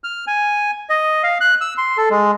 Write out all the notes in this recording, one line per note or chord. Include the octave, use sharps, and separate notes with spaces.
F6
G#5
D#5
F5
F#6
E6
C6
A4
G#3